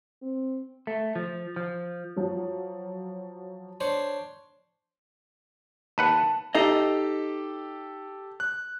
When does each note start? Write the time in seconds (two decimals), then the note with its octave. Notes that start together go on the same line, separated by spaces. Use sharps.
0.22 C4
0.87 A3
1.16 F3
1.56 F3
2.16 F3 F#3
3.80 D4 C5 C#5
5.98 D#2 B4 F#5 A5
6.55 D#4 G4 A4 D#5 C7
8.40 F#6